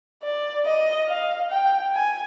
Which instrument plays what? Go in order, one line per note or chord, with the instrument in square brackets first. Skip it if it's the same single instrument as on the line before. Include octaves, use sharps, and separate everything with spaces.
[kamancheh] D5
D#5
F5
G5
G#5